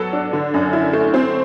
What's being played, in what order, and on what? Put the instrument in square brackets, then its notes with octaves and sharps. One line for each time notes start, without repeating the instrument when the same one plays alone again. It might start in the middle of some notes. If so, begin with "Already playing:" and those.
Already playing: [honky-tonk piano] F#3 B3 A4
D4
D3
F#2
E4
A3
C4